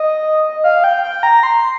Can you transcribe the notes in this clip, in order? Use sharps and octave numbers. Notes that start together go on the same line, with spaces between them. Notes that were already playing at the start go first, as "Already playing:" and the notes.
Already playing: D#5
F5
G5
G5
A#5
C6